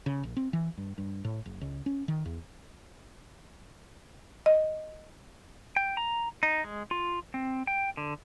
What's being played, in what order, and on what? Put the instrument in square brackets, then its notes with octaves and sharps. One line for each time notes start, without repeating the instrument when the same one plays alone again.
[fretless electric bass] C#3
A#1
C4
E3
G2
G2
A2
F#1
C#2
C#4
D#3
E2
[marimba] D#5
[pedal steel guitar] G5
A#5
D#4
G#3
F4
C4
G5
D3